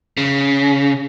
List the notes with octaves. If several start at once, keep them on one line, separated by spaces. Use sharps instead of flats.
C#3